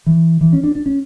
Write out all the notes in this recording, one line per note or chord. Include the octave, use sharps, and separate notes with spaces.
E3
E3
C#4
D4
D4
C#4